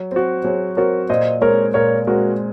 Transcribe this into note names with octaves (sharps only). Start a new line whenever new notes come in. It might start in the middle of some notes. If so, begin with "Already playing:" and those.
Already playing: F#3
C4 F#4
F#3 G#4 C5
C4 F#4 A#4 C#5
A#2 C5 D#5
G#3 C4 A#4 C#5
A#2 A#4 C#5
G#3 C4 F#4 A#4